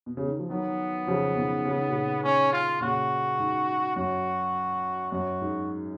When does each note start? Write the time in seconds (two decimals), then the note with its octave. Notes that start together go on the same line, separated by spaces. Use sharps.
0.06 B2
0.17 C#3
0.28 D#3
0.39 F3
0.49 D#3 F#3 B3
1.07 C#3 F3
1.36 B2 D#3
1.65 C#3
1.77 D#3
1.89 A#2 C#3
2.24 C#4
2.53 F4
2.81 A#2 C#3 F#4
3.39 G#2
3.96 F#2 F#4
5.12 F#2 F#4
5.41 G#2